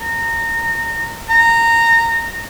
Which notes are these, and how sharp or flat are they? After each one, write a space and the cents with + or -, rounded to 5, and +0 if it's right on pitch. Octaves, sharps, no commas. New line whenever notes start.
A#5 -25
A#5 -20